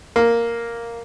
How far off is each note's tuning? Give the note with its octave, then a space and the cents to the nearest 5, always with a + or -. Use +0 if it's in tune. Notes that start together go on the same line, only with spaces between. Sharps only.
A#3 +0